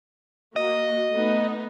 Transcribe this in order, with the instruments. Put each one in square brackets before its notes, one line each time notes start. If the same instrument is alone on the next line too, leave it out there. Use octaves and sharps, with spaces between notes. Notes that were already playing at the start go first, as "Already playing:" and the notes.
[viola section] A#3 F#4 [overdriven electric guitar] D#5
[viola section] A3 B3 D#4